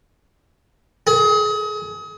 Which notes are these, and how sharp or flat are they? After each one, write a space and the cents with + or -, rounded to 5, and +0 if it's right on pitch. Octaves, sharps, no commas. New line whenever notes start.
G#4 +30